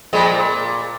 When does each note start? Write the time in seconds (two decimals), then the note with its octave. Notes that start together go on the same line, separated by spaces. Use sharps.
0.13 F2 A#2 G#3
0.26 A#2